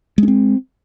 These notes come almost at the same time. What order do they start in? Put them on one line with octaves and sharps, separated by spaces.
G#3 C#4 C4